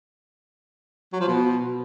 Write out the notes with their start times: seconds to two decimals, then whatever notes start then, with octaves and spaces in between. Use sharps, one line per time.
1.13 F#3
1.21 F3
1.28 B2